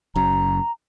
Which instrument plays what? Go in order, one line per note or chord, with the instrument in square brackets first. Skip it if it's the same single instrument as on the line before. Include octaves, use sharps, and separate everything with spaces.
[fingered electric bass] F#1 F#2 [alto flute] A#5